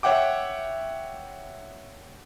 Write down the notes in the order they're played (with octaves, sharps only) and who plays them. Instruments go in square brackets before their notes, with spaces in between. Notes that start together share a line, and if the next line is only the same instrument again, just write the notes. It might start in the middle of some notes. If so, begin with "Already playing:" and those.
[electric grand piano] C#5 E5 F#5 G5 D6